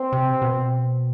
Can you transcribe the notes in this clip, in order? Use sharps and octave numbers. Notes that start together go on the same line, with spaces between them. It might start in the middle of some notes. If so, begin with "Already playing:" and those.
Already playing: C4
C3
B2